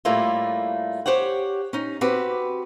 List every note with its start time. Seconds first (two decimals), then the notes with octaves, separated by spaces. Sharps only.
0.05 A2 G3 A3 A#3 E4 F4
1.06 G4 C5 C#5 F#5
1.73 C#4 D#4
2.01 C4 F#4 G4 B4